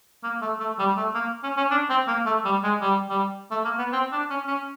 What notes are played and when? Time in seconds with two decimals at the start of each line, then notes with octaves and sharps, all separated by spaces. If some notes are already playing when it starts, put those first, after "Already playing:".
0.24 A#3
0.42 A3
0.60 A3
0.79 G3
0.97 A3
1.15 A#3
1.43 C#4
1.57 C#4
1.71 D4
1.90 C4
2.08 A#3
2.26 A3
2.45 G3
2.63 G#3
2.81 G3
3.10 G3
3.51 A3
3.65 A#3
3.79 B3
3.93 C4
4.12 D4
4.30 C#4
4.48 C#4